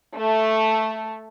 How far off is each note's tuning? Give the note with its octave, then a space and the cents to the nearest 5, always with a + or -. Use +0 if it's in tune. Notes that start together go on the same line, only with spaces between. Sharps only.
A3 +0